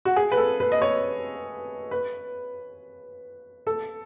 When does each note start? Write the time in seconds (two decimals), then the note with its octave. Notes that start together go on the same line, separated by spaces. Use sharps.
0.05 F#4
0.16 G#4
0.32 B4
0.37 A4
0.60 B4
0.72 D#5
0.82 C#5
1.91 B4
3.67 A4